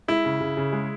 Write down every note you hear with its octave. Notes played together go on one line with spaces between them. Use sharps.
G#3 E4
C#3
C#3
C#3
G#3